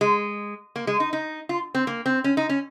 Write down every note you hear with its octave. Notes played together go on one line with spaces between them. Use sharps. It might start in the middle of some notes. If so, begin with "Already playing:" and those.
G#3
A#3
G#3
D#4
D#4
F4
C4
A#3
C4
C#4
D#4
C#4